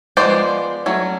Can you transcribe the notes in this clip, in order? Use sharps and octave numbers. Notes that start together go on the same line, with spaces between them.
F3 G#3 B3 C5 D5
F#3 A3 C#4